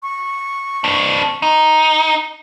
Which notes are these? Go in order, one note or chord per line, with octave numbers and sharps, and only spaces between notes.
C#6
C4 D4
D#4